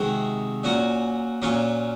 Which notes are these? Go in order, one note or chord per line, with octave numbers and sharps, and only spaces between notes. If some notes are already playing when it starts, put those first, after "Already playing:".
Already playing: C3 D#3 G#3 C4 F#4
A#2 F#3 C#4 F#4
A#2 F#3 C#4 F4